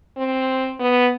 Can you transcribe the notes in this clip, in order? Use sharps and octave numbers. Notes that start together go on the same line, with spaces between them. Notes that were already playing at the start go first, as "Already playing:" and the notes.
C4
B3